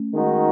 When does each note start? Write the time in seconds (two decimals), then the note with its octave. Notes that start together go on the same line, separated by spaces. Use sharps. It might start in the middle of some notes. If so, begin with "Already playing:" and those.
Already playing: A3 C#4
0.13 D#3 G#3 D#4 F#4